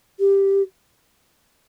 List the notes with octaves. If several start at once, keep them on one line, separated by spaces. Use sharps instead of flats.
G4